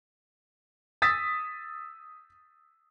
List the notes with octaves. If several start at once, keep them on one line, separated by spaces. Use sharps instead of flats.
D#6 E6 A6 B6